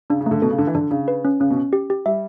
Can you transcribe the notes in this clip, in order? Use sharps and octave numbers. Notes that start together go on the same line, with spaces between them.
C#3 D4
C#3
D3 A3
B2 A4
C#3
D3 D4
E3
D3 D4
C#3 D4
B4
C#4
C#3 C#4
B2
C#4
G4
G4
G3 E5